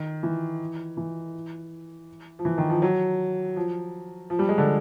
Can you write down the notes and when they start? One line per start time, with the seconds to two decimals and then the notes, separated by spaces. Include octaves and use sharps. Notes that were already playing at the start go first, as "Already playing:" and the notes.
Already playing: D#3
0.23 E3
0.97 E3
2.39 F3
2.45 E3
2.58 D#3
2.70 F3
2.82 F#3
3.56 F3
4.30 F3
4.39 G3
4.49 G#3
4.58 D3